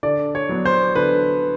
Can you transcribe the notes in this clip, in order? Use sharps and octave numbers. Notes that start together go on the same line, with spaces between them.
D3 D5
C#5
F#3 B3 D4
C5
D3 B4